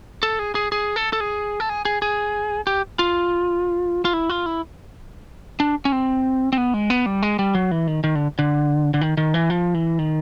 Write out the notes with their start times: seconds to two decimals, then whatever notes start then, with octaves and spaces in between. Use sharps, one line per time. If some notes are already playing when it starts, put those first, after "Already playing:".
0.23 A4
0.39 G#4
0.55 G#4
0.72 G#4
0.96 A4
1.13 A4
1.20 G#4
1.60 A4
1.69 G#4
1.85 G#4
2.02 G#4
2.67 G4
2.99 F4
4.05 F4
4.13 E4
4.29 F4
4.46 E4
5.60 D4
5.85 C#4
5.92 C4
6.53 C4
6.58 B3
6.74 G#3
6.90 B3
7.06 G3
7.22 G#3
7.39 G3
7.55 F#3
7.71 E3
7.87 D#3
8.04 D#3
8.15 D3
8.39 D3
8.94 D3
9.01 D#3
9.17 D#3
9.34 E3
9.50 F3
9.74 E3
9.99 D#3